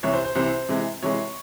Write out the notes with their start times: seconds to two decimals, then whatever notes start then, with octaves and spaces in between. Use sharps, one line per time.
0.03 C2 C3 E3 C#5
0.14 C5
0.25 C5
0.35 C2 C3 E3 C5
0.69 C3 E3 G#3
1.03 C3 E3 G#3 C#5